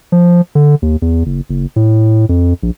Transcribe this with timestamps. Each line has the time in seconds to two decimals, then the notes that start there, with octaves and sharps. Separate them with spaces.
0.12 F3
0.55 D3
0.82 D#2
1.02 E2
1.26 F#1
1.49 F#1
1.76 A2
2.29 F2
2.63 A#1